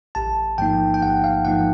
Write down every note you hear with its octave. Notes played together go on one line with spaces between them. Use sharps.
A1 A5
G#2 F3 A#3 D#4 G5
G5
A1 F#5
F5
G#2 F3 A#3 D#4 F#5